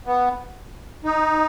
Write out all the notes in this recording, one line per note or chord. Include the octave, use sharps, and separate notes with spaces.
B3
D#4